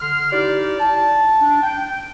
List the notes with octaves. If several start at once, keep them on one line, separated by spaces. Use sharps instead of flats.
D3 C6 F6
D#4 E4 G4 D5
A5
D4
G5